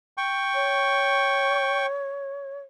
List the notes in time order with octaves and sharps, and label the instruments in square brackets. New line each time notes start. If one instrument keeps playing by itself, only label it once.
[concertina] G5 C#6
[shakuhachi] C#5